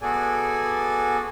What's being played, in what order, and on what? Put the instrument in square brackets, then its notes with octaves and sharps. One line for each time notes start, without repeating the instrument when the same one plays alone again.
[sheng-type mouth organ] B3 F#4 G#4 A4 D5 G#5